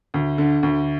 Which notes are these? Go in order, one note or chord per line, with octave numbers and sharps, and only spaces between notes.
D2
D3
D2